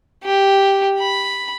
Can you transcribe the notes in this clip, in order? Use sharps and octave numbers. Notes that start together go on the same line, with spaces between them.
G4
B5